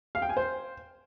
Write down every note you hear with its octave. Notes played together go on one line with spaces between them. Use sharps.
F5
G5
G#5
C5